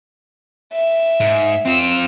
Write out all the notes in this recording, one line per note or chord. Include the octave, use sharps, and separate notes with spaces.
E5
G#2
C4 F4 E6